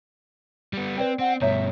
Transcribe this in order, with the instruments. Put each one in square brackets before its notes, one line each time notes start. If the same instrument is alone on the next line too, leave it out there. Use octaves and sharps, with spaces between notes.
[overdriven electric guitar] G3 B3
[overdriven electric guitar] C4 [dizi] B4 [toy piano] D5 G5
[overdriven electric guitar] C4 [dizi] F#5
[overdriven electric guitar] G2 B2 [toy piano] C#5 A#5 [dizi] E5